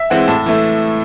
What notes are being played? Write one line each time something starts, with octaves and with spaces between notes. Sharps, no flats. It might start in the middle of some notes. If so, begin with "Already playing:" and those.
Already playing: E5
E3 G#3 C4 F#5
A2 A5
E3 A3